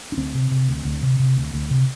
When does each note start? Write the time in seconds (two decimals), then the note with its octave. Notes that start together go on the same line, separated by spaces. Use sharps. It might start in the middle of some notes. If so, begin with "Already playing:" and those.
0.12 D4
0.17 D2 C4
0.35 C3
0.51 C3
0.68 D2
0.85 D2
1.03 C3
1.19 C3
1.37 D2
1.54 D2
1.71 C3